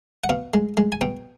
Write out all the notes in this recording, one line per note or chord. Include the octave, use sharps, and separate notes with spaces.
F#5
B2 F5
G#3
G#3
G#5
B2 G5